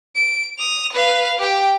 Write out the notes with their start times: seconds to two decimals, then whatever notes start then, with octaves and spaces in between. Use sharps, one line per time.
0.15 D7
0.58 D#6 F7
0.93 B4 F5
1.39 G4 G5